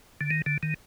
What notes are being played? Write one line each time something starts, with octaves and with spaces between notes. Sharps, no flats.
D3
D#3
D3
D#3